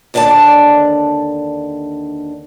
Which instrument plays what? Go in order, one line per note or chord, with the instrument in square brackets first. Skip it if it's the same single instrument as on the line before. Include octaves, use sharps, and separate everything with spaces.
[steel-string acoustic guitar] D#2 D3 D4 D5 A5